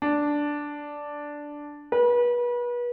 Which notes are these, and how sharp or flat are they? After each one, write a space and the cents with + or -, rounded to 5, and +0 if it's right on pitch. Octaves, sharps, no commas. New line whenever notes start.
D4 -5
B4 -35